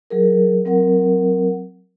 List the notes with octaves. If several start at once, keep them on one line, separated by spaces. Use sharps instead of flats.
F#3 G#4 A#4
F#3 C4 A#4 F#5